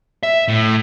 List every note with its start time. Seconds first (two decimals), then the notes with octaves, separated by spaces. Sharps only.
0.23 E5
0.48 A2